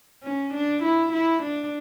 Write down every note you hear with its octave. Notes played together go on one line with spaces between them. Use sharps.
C#4
D4
E4
E4
D4